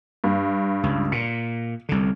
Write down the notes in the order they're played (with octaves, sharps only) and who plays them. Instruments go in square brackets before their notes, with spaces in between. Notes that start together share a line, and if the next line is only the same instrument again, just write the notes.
[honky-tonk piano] G2
[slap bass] C#2
[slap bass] A#2 [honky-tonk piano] C#7
[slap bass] C2 D3